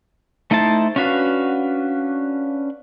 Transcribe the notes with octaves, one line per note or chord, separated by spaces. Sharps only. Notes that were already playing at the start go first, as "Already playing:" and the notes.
A3 D#4 E4 C5 A5
C#4 D4 F#4 B4 F5